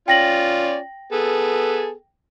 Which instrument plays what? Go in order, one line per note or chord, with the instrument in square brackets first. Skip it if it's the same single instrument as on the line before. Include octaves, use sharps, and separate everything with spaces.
[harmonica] C#4 F4 D5 [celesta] G5 A#6 F#7
[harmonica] B3 G#4 A4